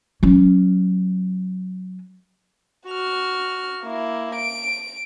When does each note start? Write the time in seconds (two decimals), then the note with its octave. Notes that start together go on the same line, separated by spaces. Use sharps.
0.23 F#3 C#4
2.88 F#4 F6
3.82 A#3 E4
4.35 D7